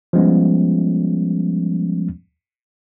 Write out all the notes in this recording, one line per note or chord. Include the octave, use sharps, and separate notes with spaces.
F3 G3 G#3 B3 C#4